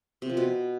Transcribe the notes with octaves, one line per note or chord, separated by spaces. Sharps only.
C3
F3
B2